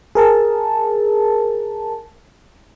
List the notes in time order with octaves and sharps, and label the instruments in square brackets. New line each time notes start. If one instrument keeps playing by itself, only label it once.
[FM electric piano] G#4 A#4 A5